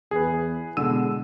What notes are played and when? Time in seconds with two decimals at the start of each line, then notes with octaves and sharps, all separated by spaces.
0.11 E2 G#4 B4
0.77 B2 D3 G#3 E6 D#7